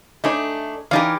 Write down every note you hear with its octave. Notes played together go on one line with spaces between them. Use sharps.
A3 D4 D#4 G#4 C#5
E3 D#4 G4 A#4 D5 F5